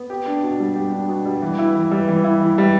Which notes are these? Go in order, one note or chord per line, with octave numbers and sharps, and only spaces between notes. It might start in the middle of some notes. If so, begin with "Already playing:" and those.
Already playing: B3
G4
D4
B2
G3
G4
D4
B2
G3
E3
E4
E3
G3
E3
E4
E3
G3